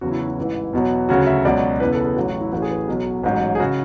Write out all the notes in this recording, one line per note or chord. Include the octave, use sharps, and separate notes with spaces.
E2 C#3 F#3 F#4
E4
F#4
E4
A1 G#2 E3
E2 B2 F#3
D2 C#3 F#3 F#4
E5
C#2 B2 F#3 D5
E2 C#3 E3 B4
A4
G#4
A1 A2 F#3 F#4
F#4
E4
A1 A2 E3 F#4
G#4
B4
B1 B2 F#3
A1 G#2 F#3
G#4
C#3 F#4